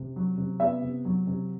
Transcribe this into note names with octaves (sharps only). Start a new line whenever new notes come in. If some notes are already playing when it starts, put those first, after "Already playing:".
Already playing: C3
F#3
C3
B3 E5
C3
F#3
C3